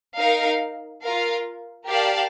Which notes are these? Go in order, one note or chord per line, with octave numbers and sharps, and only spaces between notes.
D#4 A#4 F5
F4 A#4 F5
G4 A#4 D5 F5 A5